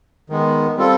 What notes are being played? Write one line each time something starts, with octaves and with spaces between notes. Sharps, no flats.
D#3 G#3 B3
G3 C4 F4 A4